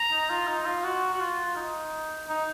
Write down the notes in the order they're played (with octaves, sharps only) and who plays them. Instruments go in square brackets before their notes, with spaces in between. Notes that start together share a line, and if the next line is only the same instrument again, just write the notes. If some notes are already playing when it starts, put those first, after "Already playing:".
Already playing: [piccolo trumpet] A#5
[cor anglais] D#4
F4
D#4
F4
F#4
F#4
F4
D#4
D#4